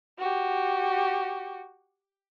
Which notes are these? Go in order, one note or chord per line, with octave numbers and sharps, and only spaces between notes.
F#4 G4